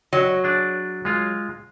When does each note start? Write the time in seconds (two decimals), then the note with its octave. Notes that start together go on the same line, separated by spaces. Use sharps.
0.13 F#3 D#5
0.44 D4 G#4
1.05 G#3 F4